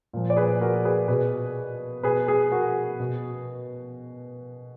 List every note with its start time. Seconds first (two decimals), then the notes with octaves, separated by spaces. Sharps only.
0.13 A#2 F3
0.30 D5
0.36 G#4 B4
0.61 F#4 A#4
0.85 G#4 B4
1.08 B2 G#4 B4
2.03 B2 G#4 B4
2.28 G#4
2.52 F#4 A#4
3.00 B2